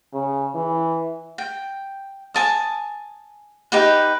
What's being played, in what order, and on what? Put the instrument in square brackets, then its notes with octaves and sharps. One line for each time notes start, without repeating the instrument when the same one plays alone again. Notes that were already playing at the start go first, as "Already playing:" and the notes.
[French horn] C#3
E3
[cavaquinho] G5
G#5 A5 D#6
D#4 G4 B4